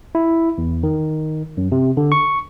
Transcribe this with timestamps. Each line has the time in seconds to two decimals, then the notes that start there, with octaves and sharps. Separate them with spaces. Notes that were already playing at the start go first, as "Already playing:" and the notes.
0.15 E4
0.58 E2
0.83 D#3
1.57 F#2
1.72 C3
1.97 D3
2.12 C#6